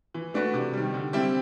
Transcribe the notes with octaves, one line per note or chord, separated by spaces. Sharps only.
E3
A3 D4 F#4 B4
C3
D#3 G3
D3
G3 C4 E4 G4